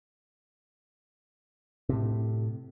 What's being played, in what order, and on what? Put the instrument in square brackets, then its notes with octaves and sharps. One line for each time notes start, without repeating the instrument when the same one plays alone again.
[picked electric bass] A2 C3